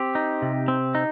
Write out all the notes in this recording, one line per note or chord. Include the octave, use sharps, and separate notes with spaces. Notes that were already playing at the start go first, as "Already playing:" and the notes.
Already playing: C4 G4
D#4
C3
C4
D#4